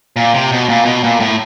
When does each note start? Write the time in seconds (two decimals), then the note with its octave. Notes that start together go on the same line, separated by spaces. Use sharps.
0.16 A#2
0.34 C3
0.52 B2
0.69 A#2
0.85 B2
1.03 A#2
1.20 A2